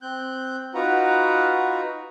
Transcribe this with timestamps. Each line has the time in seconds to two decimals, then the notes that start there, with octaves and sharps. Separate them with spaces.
0.02 C4 F#6 G6
0.74 D#4 F4 F#4 B4 F#5 A#5